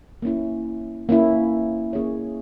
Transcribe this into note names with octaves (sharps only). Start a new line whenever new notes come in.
A#3 C#4 E4
A#3 C#4 E4
A#3 C#4 G#4 C#5